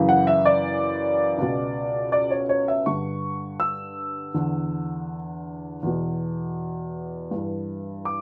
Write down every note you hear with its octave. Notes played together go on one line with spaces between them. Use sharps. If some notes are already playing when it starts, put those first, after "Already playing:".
Already playing: F#2 C#3 E3
F#5
E5
D5
C#2 B2
D5
C#5
C#5
E5
G2 D3 C#6
E6
E2 D3
E2 B2
G2 E3
D6